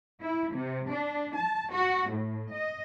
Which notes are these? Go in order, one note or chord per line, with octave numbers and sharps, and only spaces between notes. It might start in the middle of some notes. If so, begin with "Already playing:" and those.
E4
C3
D4
A5
F#4
A2
D#5